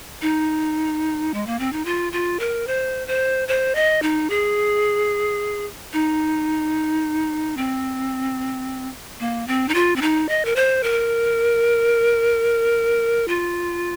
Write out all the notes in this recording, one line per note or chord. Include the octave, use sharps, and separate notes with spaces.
D#4
G#3
A#3
C4
D#4
F4
F4
A#4
C5
C5
C5
D#5
D#4
G#4
D#4
C4
A#3
C4
D#4
F4
C4
D#4
D#5
A#4
C5
A#4
F4